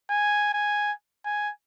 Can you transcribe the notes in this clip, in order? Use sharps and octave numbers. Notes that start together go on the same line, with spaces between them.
G#5
G#5
G#5